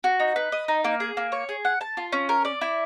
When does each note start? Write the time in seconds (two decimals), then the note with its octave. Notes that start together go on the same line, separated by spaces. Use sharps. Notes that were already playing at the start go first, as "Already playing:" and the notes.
0.04 F#4
0.20 D#4
0.36 B4
0.52 D#5
0.68 D#4
0.84 A#3
1.00 G#4
1.17 A#3
1.32 C#5
1.49 G#4
1.65 F#5
1.81 A5
1.97 F4
2.12 C#4
2.29 A#4
2.45 D5
2.61 E4